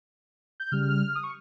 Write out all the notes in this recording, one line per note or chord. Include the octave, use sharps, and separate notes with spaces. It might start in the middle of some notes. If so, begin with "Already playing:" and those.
G6
C#3 G3 F6
D#6
C#6